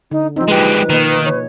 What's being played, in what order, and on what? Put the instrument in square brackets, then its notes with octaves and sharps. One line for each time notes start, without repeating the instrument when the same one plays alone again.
[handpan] D3 [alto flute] D#4
[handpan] F3 D#4 [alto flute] C4
[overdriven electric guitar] G#3 G4 [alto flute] B4
[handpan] B2 A#3 D#5 [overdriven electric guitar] D#3
[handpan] C#5